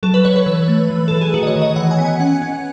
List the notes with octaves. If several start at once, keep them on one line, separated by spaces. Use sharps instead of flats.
F#3 A4
B4
F#3 C#5
B4
E3
A3
E3
E3 A4
G#4
D#3 F#4
D#5
C#5
D#3
D#5
E3 F#5
G#5
B3
G#5
C#4 F#5
C#4